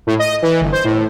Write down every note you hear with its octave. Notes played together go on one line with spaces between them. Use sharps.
A2
D#5
E3
G1
C5
A2